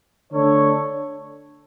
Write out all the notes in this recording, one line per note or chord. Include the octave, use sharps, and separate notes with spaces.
D3 A3 D4 A4 C#5